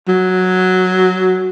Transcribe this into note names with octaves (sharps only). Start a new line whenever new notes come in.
F#3